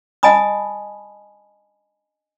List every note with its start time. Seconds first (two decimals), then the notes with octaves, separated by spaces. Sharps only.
0.23 D#5 G#5 A5 B5 D#6